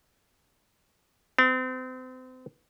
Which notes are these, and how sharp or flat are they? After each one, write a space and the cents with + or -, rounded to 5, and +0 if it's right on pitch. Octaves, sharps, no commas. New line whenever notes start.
C4 -35